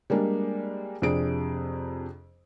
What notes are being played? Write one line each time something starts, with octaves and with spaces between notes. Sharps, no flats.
G3 G#3 A#3 D4
F2 C3 D4 G#4 D7